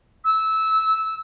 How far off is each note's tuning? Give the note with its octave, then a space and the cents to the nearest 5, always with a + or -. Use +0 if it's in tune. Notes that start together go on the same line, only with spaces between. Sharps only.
E6 -15